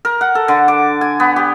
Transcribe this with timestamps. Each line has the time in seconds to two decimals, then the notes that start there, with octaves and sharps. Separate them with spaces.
0.05 A#4
0.21 F#5
0.35 A4
0.48 D3
0.68 D6
1.01 G#5
1.20 B3
1.36 G4